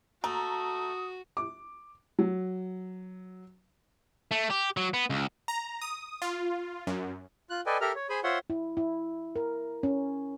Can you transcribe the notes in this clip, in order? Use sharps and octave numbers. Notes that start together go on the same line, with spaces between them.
A3 F#4 A#5 D#6
D6
F#3
A3
G4
F#3
B3
C#2
A#5
D#6
F4
F#2
F4 F#6
A4 B4 D5 D#5 G5 G#5
G4 A4 A#4 E5 A#5 F6
C#5
G#4 C5 G#5 B5
F4 C5 C#5 E5 F#5 C6
E4
E4
A#4
C#4